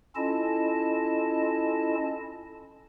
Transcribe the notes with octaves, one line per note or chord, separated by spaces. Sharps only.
C#4 E4 F4 A4 D#5 A5